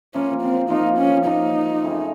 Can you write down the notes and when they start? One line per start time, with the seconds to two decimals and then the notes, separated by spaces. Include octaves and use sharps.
0.14 F3 A#3 C#4 F4
0.42 C4
0.70 F3 A#3 D#4 F4
0.98 C#4
1.26 F3 A#3 D#4 F4
1.82 F#2 C#3 A3 C4